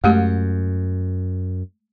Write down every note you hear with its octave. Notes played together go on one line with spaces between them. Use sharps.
F#2 G#3 A3 G4